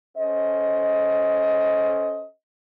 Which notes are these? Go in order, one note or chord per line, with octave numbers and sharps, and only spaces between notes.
C#4 A4 C5 D#5